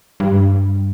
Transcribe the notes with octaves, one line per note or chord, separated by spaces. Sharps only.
G2